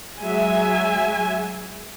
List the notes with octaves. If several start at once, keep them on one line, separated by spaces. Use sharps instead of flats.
F#3 G#3 E5 G#5